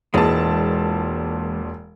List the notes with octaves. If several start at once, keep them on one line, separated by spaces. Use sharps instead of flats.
E1 A#2 E3 G#3 A5